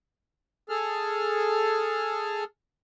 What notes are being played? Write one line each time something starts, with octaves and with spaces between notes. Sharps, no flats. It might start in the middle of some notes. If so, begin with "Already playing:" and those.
G#4 A4 F6